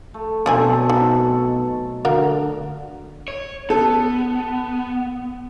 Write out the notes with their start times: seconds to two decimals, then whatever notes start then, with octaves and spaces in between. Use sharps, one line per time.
0.14 A3
0.46 B2 F#3 A3 C4 D4 A4 G#5
0.90 D#4 C#5
2.05 D3 F#4 A#4 F5
3.28 C#5
3.70 B3 A4